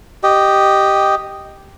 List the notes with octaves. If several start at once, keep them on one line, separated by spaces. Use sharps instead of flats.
G4 D#5